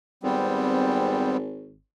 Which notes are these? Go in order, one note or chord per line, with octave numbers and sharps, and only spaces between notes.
G#1 G3 B3 C4